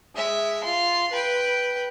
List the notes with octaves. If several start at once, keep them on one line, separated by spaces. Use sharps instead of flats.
G#3 E5
F4 C6
B4 G5